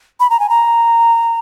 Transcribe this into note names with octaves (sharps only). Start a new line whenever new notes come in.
B5
A#5
G#5
A#5